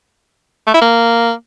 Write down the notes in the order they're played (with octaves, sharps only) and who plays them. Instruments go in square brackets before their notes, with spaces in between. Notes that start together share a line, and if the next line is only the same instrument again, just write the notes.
[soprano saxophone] A3
E4
A#3